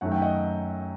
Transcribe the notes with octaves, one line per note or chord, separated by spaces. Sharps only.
F#2 D#3 A3 F#5
G5
D#5 F#5